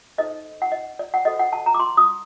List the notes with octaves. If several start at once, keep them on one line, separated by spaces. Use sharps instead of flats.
D#4 A4 C5 D#5
F#5
D#5
D5
F#5
F#4 A4 C5 D#5
F#5
A5
A#5
D6
C6
D#6